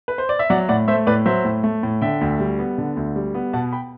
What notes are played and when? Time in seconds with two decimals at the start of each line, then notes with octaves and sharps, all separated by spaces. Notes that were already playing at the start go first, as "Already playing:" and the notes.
0.08 B4
0.18 C5
0.29 D5
0.39 E5
0.50 F#3 D5 F#5
0.69 A2 D5 F#5
0.88 A3 C5 E5
1.07 A2 B4 D5
1.26 F#3 C5 E5
1.45 A2
1.63 A3
1.83 A2
2.02 D3 E5 G5
2.21 D2
2.40 G3
2.59 B3
2.78 D3
2.96 D2
3.16 G3
3.34 B3
3.53 B2 F#5 A5
3.72 G5 B5